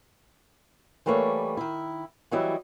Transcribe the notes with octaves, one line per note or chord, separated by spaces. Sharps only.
E3 G3 A3 A#3 B4 C#5
D#3 E4
E3 F#3 G3 E4 D#5